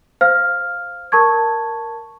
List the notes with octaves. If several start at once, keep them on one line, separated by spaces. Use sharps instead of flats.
C5 F5 F6
A#4 A5 C#6 G#6